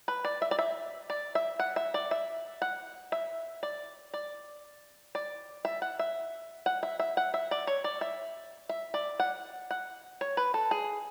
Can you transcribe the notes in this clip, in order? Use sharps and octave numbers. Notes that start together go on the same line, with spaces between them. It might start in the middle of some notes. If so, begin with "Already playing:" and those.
B4
D5
E5
D5
E5
D5
E5
F#5
E5
D5
E5
F#5
E5
D5
D5
D5
E5
F#5
E5
F#5
E5
E5
F#5
E5
D5
C#5
D5
E5
E5
D5
F#5
F#5
C#5
B4
A4
G#4